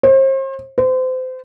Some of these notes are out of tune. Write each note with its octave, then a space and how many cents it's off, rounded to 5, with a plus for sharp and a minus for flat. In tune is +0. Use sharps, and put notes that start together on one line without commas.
C5 +40
C5 -30